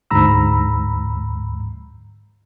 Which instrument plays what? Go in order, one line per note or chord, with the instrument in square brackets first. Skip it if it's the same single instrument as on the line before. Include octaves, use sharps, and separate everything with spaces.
[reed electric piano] D2 G#2 A#5 B5 E6